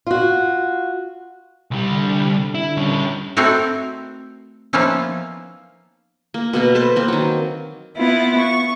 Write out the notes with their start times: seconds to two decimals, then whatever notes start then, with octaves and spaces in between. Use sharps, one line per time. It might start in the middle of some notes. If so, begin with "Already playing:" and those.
0.07 F4 F#4
1.71 C2 G3
1.91 D3
2.55 E4
2.77 G3 C#4
3.37 A3 C4 D#4 E4 F#4 A#4
4.73 F3 A#3 B3 C#4 D#4 E4
6.34 A#3
6.53 B2 A#3 B3
6.75 A4 B4 C5 A5
6.96 A#3 C4
7.08 D#3 F#3
7.96 B3 E4 F4
8.37 C#6